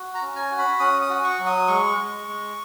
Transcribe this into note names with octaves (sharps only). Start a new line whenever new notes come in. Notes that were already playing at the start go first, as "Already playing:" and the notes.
Already playing: F#4
A#5
C#4
G#5
F#4
B5
C#4 D#6
D#6
F#4
C#6
F#3
D#6
G#3 C#6
G#3
G#3